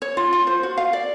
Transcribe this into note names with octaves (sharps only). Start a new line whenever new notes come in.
C#5
F4
F4
C5
F#4
F5
D5